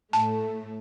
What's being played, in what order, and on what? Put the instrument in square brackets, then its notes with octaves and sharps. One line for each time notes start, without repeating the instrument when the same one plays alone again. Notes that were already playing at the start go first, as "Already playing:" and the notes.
[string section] A2 A3 [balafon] A5